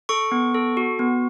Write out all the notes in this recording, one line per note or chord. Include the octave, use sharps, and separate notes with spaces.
A4 C#6
B3
A4
F#4
B3